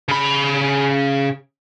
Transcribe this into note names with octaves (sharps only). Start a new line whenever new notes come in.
C#3 B5